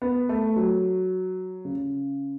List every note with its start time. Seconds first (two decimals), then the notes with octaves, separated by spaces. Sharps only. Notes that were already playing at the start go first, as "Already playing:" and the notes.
0.02 B3
0.29 A3
0.56 F#3
1.65 C#3